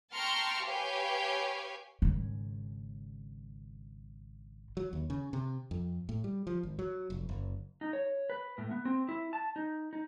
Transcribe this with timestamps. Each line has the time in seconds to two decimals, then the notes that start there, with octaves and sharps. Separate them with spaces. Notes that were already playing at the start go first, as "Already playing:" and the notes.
0.14 G5 A5 A#5 C6 C#6 F6
0.66 G4 B4 C#5 F5 G5 G#5
2.02 G#1 C#3
4.77 F#3
4.93 D#2
5.10 C#3
5.33 C3
5.71 F2
6.09 A2
6.24 G3
6.47 F3
6.63 G#1
6.79 F#3
7.10 F1
7.29 F#1
7.81 D#4
7.93 C#5
8.30 B4
8.58 A2
8.71 B3
8.85 C4
9.09 E4
9.33 A5
9.56 D#4
9.93 D#4